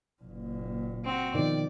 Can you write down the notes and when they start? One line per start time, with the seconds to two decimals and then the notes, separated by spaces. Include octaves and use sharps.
0.23 F#1 A#2
1.05 C4 F#4
1.34 B2 D#3 F3 D5